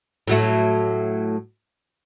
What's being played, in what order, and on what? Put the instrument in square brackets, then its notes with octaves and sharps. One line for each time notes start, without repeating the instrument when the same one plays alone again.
[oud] A2 F#3 A3